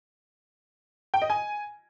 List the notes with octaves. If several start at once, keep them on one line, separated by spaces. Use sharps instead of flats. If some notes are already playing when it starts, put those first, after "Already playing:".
G5
D#5
G#5